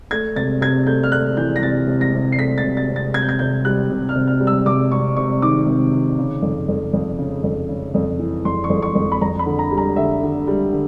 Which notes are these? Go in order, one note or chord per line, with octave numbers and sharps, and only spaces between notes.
A3 G#6
C3 A6
C3 G#6
A3 G6
F6
A3 F#6
E3 G6
A#6
C3 A6
C3
A#6
C3
C7
A3 B6
A6
C3
A6
C3
A6
C3 G#6
G6
G#6
C3 G6
G3 F#6
C3
F6
C3
F6
G3
E6
C3 D6
C3 C#6
C3 C#6
D#3 D6
C3
D#3
C#3
F2
F2
F2
C#3
F2
C#3
F2
E3
F2 C6
C#6
F2
C#6
F2
B5
F2 A#5
B5
D3
A#5
G3
A#5
D3 E5
D3
G3
D3